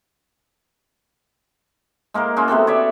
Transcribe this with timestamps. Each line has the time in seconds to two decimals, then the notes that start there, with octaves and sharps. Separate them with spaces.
2.14 G#3 A#3 A#4 C5
2.37 G#3 C#4 F#4
2.48 C3 B3 C4 A4
2.67 C#5 D5 E5